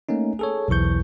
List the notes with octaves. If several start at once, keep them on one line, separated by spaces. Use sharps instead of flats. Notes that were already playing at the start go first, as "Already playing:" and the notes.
A3 A#3 C#4 D#4
G#4 A4 C#5
B1 E2 E3 C#6 G6